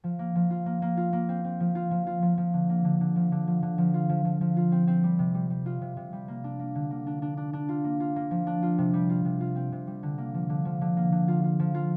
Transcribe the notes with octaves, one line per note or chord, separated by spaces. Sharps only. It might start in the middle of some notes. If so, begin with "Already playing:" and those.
F3
A#3
F3
F4
A#3
A#3
F4
A#3
C4
C4
F3
F4
F3
F4
F3
F3
D3
A#3
D3
D3
F3
D3
F3
D3
F3
F4
F3
F3
F3
F4
C4
C4
G3
C3
G3
G3
F4
C3
C3
G3
A#3
D4
A#3
D3
A#3
D4
D4
D4
D4
F4
A#3
F4
A#3
F3
D4
F4
C3
G3
F4
C3
F4
C4
C3
G3
D3
A#3
F3
D3
F3
D3
A#3
D3
F4
F4
F3
F4